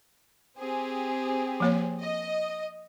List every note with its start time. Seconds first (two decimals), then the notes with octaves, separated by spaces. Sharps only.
0.58 C4 G4 G#4
1.60 F3 A#3 C#5
2.01 D#5